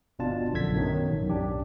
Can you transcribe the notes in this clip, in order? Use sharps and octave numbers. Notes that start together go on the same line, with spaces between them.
G1 B2 D4 F4 A5
A#1 F#2 D3 A4 G#6 B6
F#2 B2 D#3 F#3
A1 F#2
B1 D4 G4